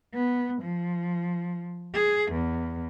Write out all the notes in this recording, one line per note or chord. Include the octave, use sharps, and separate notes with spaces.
B3
F3
G#4
E2